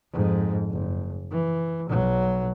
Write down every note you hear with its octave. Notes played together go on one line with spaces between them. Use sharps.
F2 G#2
F#1
E3
B1 F#3